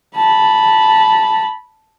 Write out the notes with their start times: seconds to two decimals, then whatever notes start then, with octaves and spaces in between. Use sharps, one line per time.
0.17 A5 B5